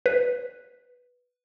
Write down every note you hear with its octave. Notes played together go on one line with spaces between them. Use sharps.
B4